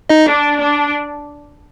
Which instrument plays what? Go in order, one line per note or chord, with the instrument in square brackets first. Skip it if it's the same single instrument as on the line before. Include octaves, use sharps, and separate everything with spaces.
[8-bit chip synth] D#4 D#5
[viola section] D4
D4